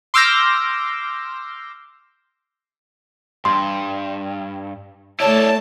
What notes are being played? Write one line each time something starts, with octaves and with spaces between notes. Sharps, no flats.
C6 D6 E6 F6 G6 A#6
G2 C6
A3 E4 C#5 D5 A5